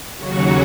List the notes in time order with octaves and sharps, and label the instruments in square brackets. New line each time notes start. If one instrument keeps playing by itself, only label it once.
[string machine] D#2 C#3 F#3 F#4